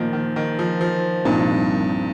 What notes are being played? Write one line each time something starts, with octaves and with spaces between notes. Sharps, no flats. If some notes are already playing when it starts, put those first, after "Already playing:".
Already playing: A#2 D#3 F3 A#3
D#3
D#3
F3
F3
C2 G2 A#2 F3 C4 D#4